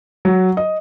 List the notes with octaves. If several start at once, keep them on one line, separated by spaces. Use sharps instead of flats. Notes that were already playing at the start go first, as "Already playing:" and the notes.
F#3
D#5